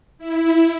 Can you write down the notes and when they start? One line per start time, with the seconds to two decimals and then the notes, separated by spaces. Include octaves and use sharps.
0.18 E4